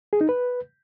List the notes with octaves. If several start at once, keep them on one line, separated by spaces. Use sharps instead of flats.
G#4
D#4
B4